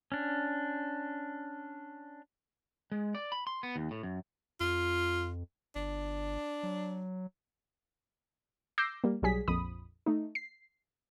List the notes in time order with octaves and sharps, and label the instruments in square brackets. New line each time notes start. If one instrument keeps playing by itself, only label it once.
[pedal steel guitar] C#4 D4
[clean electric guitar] G#3
D5
B5
C6
B3
D#2
A2
F#2
[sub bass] F2 [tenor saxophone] F4
[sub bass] G1 [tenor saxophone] D4
[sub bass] F#3
[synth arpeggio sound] D6 E6 G6 A#6 C7
G3 A#3
B1 F#3 G3 G#4 B6
A#1 F2 B5 D#6
A3 D#4
C7